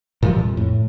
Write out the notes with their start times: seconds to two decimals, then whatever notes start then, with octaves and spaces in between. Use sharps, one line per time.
0.22 A#2 E3 F3 G3
0.40 F2
0.57 A2